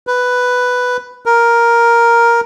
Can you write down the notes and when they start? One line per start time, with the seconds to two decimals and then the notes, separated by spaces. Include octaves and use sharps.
0.07 B4
1.26 A#4